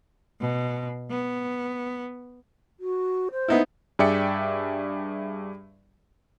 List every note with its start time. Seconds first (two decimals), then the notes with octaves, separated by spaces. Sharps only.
0.41 B2
1.10 B3
2.80 F#4
3.32 C5
3.48 B3 D#4 E4
3.99 G2 G#4 D5 E5 G5 C#7